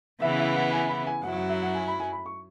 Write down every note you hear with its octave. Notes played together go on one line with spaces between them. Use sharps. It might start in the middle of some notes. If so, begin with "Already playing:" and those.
C#3 E3 B3 E4 E5
E5
F#5
G#5
B5
G#5
F#2 F#3 E4 F#5
F#5
E5
F#5
G#5
B5
G#5
B5
C#6